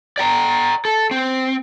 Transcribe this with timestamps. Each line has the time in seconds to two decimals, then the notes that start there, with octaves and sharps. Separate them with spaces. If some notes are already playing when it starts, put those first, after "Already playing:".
0.18 D5 G5 A#5
0.85 A4
1.11 C4